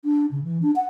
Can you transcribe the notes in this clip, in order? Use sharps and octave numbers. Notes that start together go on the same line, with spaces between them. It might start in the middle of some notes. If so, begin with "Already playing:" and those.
D4
C#3
E3
D4
F#5